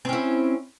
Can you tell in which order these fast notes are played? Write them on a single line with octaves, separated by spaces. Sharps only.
C4 C#4 E4